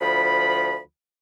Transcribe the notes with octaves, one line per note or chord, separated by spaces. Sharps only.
D2 F3 B5